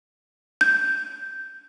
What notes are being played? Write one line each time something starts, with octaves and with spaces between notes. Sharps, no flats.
G6